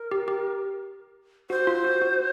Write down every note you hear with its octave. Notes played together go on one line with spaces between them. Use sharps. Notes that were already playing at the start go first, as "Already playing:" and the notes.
Already playing: A#4
G4
G4
F#4 C5
F4
F#4
F#4